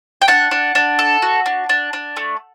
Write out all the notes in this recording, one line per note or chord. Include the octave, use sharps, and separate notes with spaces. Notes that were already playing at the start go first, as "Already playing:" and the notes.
G5
D4 F#5
D4
D4
A4
F#4
D4
D4
D4
A3